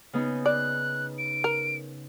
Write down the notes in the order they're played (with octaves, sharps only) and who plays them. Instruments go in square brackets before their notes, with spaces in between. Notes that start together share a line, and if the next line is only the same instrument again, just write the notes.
[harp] C#3 B3 D#4
[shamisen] D5 [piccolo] F#6
[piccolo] D7
[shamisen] A#4